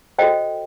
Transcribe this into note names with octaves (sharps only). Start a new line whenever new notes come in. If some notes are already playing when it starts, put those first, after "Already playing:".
F#4 A4 C5 D#5 G5